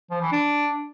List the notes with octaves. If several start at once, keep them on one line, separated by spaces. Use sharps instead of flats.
F3
E3
D4